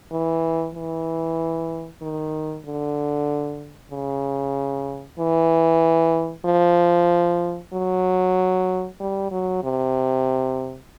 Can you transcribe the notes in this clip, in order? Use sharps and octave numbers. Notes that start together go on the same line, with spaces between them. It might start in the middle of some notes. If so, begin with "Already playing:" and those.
E3
E3
D#3
D3
C#3
E3
F3
F#3
G3
F#3
C3